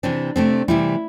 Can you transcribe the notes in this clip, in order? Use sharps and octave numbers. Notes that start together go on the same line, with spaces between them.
C3 E3 C4 D4
C3 A3 C4
C3 E3 G3 E4